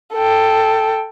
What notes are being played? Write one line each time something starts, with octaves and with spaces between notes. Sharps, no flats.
A4 G5